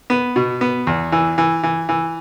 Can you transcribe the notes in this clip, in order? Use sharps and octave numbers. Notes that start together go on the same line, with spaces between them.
B3
B2
B3
E2
E3
E3
E3
E3